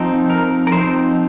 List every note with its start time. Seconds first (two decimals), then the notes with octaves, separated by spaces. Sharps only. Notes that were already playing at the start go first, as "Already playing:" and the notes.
Already playing: F3 C4 D#4
0.30 A#4
0.67 A#4
0.72 F3 C4 D#4 C5